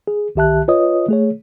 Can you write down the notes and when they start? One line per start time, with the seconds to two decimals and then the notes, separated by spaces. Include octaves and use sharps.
0.07 G#4
0.35 C2 D#3 G4 E5 A5 F#6
0.68 F4 B4 C#5 D#5 D#6
1.08 A3 G#4 C#5